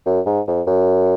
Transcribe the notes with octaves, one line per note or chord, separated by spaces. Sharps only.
F#2
G#2
F2
F#2